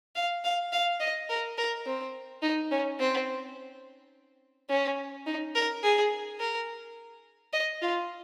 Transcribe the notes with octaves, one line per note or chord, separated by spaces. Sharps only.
F5
F5
F5
D#5
A#4
A#4
C4
D#4
C#4
C4
C#4
D#4
A#4
G#4
A#4
D#5
F4